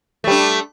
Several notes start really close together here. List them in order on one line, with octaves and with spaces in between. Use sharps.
A3 G3 D4